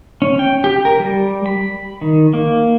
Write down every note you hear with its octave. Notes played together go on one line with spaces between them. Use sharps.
C#4
G5
G4
A#4
G3
B5
D#3
A#3